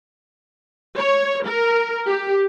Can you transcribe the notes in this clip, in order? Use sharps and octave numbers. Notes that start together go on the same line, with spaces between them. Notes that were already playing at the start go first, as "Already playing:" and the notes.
C#5
A#4
G4